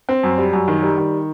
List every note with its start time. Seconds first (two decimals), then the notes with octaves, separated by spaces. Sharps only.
0.09 C4
0.23 F#2
0.38 G3
0.53 F#2
0.68 D#3
0.83 G3
0.98 D#3